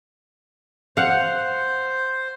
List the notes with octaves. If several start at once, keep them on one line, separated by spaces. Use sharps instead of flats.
C5 F5 F#5